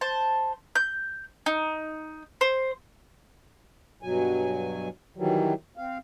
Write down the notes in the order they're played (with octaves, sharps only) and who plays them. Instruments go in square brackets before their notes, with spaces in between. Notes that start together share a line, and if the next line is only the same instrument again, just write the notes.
[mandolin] C5 A5
G6
D#4
C5
[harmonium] G2 B2 F#3 G#5
D#3 E3 F#3 G3
C4 F5